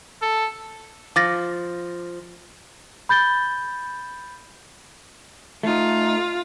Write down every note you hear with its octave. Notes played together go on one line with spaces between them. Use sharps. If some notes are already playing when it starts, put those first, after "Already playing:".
A4
F3 D6 A6 A#6
B5 G6 A6 G7
A3 D#4 F4